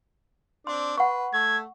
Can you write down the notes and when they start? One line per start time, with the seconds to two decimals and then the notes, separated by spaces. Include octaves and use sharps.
0.67 C4 D4 C6
0.97 B4 F#5 C#6
1.33 A3 G#6